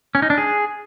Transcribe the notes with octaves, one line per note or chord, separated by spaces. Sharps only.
C#4
D#4
D4
G#4